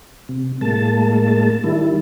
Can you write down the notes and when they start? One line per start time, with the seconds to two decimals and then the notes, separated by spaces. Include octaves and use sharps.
0.29 C3
0.61 A2 G#3 A#3 A5
1.64 D#3 G3 E4